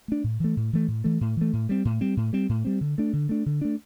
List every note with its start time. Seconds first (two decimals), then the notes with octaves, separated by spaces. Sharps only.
0.08 A3 D4
0.24 A2
0.40 E3 A3
0.57 A2
0.73 E3 A3
0.88 A2
1.04 E3 A3
1.21 A2
1.37 E3 A3
1.53 A2
1.69 G3 C4
1.85 A2
2.01 G3 C4
2.17 A2
2.33 G3 C4
2.49 A2
2.65 G3 C4
2.81 D3
2.98 A3 D4
3.13 D3
3.29 A3 D4
3.46 D3
3.61 A3 D4